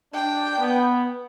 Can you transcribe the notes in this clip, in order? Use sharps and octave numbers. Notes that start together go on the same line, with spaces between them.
D4 G5
B3